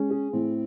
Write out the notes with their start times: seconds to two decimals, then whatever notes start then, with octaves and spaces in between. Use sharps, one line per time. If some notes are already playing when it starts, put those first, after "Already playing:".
Already playing: G#3 C#4
0.10 G#4
0.33 A2 C4